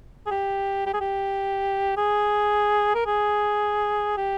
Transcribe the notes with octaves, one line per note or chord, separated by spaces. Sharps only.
G#4
G4
G4
G#4
G4
G#4
A#4
G#4
G4